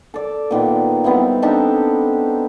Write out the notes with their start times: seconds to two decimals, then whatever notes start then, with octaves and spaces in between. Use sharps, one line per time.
0.14 A4 D5
0.51 A#2 D#3 B3
1.04 G3 B3 C4 E4
1.42 D4 D#4 G4 A4